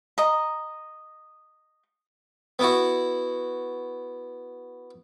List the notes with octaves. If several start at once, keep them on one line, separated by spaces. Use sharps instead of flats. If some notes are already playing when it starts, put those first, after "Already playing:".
D#5 A#5
B3 E4 F#4